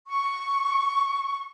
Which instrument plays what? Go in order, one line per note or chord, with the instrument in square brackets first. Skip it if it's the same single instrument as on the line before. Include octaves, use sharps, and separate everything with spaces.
[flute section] C#6